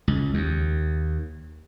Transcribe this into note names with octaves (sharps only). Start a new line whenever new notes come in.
C#2
D#2